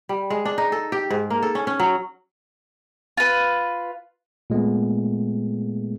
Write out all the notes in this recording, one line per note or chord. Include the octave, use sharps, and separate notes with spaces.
G3
G#3
D4
D#4
A4
G4
G#2
A#3
A4
C#4
C#4
F#3
F4 B4
A#2 G#3 A3 B3